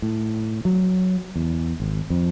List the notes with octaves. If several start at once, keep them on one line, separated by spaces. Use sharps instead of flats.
A2
F#3
E2
G#1
F2